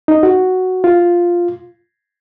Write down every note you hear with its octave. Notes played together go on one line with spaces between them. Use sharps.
D#4
F#4
F4